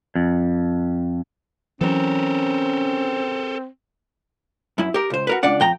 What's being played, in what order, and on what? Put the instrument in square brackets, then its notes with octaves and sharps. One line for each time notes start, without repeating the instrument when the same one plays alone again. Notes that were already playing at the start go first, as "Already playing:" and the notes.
[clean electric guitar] F2
[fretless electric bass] E3 F#3 [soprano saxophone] C4 [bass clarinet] C#4 [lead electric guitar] A4 A#4
[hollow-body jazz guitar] F#2 E4
G4 A#4
C#2 C5
F#4 A#4 B4
C#2 C#3 D4 D5 F#5
F2 G5 A#5